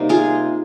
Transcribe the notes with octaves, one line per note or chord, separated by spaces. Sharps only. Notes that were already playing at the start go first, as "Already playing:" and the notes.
Already playing: C3 G3 A#3 D#4
F4 G#4